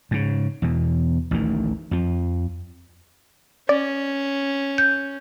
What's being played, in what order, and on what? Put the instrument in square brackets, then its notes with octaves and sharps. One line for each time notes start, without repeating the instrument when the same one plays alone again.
[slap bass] G#2 C#3
E2 B2
A1 D2 D#3
F2 F3
[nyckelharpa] C#4 [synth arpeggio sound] D5
[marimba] G6